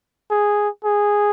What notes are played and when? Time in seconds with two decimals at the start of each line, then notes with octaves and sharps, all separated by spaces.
0.31 G#4
0.85 G#4